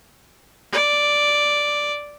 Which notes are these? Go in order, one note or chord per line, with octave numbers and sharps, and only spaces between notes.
D5